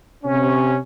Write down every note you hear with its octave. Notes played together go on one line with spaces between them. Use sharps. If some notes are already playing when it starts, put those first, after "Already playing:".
C3 C#4